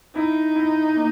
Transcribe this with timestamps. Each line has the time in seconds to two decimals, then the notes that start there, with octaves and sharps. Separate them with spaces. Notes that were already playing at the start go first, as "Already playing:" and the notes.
0.15 D#4 E4
0.56 E4
0.96 A#3